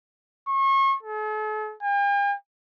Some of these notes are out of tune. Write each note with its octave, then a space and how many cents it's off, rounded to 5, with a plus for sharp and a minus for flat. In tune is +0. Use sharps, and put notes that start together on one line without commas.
C#6 -35
A4 -45
G5 +45